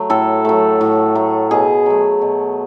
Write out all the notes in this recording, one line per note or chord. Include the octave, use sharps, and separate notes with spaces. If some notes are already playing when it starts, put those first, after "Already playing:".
Already playing: F#3 A3
A2 A4
F#3 A3
A2
F#3 A3
B2 G#4
F#3 A3
B2